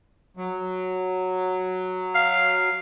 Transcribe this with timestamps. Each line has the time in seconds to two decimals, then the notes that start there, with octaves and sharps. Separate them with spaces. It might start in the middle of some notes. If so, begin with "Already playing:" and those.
0.37 F#3
2.15 F5